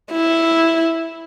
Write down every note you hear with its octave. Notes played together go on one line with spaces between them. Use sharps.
E4